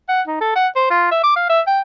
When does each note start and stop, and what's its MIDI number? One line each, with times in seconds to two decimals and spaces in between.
0.09 0.21 78
0.27 0.39 63
0.41 0.55 69
0.56 0.68 78
0.76 0.88 72
0.90 1.08 65
1.11 1.19 76
1.24 1.34 86
1.36 1.47 77
1.50 1.61 76
1.67 1.81 79